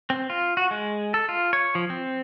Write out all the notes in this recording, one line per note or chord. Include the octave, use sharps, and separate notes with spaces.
C4
F4
F#4
G#3
A4
F4
C#5
F3
C4